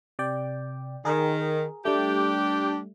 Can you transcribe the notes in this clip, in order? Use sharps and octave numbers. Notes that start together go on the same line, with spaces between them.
C3 D5 G5
D#3 G#4 A#4
G3 A3 D4 G4